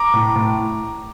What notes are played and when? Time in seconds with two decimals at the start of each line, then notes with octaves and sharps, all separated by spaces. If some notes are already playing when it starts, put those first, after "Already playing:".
Already playing: A#5 D6
0.14 A2
0.36 A2